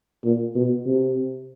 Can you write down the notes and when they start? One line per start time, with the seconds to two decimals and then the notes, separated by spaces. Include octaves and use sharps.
0.25 A#2
0.55 B2
0.86 C3